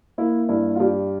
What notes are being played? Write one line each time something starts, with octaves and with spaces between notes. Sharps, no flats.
A#3 E4
G2 E4
F4
G2 G4